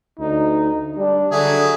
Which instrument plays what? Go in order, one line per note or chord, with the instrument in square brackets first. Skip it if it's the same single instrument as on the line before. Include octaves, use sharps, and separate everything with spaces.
[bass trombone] D2 [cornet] D#4
[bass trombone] G3 [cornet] D4
[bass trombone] D3 [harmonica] F#3 G#4 E5